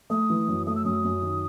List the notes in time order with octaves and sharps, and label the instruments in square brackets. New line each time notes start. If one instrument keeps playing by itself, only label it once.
[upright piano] A3 [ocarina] D#6
[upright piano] E3
F#2
[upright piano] A3 [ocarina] D#6
[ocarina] E6
[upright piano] F#2 [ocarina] D#6
[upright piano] F#2
D#3